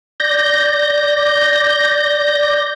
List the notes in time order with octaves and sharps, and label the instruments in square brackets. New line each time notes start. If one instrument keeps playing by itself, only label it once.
[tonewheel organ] D5 G6 A#6